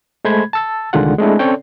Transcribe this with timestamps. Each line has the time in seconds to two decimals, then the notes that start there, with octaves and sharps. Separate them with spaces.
0.25 G#3 A3 C5 B5 G#6
0.53 A5 E6 A6
0.93 C2 D3 D#3 G#3 F4 F#5
1.19 G#3 A3 C4 D4 E4
1.39 C4 C#4 A4 C#5 D5 G5